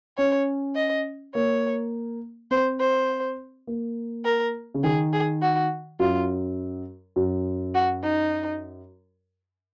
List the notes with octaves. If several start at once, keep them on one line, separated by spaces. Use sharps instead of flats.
C#4 C#5
D#5
A#3 C#5
C4 C5
C5
A#3
A#4
C#3
D#3 G#4
G#4
F#4
F#2 F4
F#2
F#4
D#4